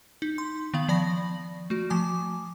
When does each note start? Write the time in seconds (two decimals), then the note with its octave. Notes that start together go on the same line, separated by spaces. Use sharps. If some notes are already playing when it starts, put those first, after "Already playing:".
0.22 D#4
0.38 C6
0.74 D#3 B3 F5 F#7
0.88 F3 D5 B5 A#6
1.70 A3 F#4
1.90 F3 G#5 D6